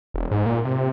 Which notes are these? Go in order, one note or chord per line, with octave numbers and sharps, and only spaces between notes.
E1
G#2
A#2
C3